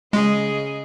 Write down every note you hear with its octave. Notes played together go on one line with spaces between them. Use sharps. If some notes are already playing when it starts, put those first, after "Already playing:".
C#3 G#3 G#4 D#5